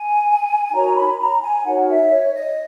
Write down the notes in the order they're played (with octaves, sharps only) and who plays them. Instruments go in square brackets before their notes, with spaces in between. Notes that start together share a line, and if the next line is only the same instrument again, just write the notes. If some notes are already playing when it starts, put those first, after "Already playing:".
Already playing: [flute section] G#5
D#4 F#4 A#4 C#5 A#5
B5
A#5
G#5
D#4 F#4 A#4 C#5 F#5
E5
C#5
D#5